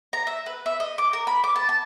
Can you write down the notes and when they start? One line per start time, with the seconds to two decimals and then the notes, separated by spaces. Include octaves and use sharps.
0.13 A#5
0.27 E5
0.46 B4
0.66 E5
0.80 D#5
0.98 D6
1.13 A#4
1.27 B5
1.44 D6
1.56 A5
1.69 A5